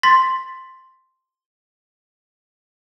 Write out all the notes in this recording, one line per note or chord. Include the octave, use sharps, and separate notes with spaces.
C6 A6 B6